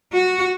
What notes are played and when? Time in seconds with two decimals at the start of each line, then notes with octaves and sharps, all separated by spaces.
0.13 F#4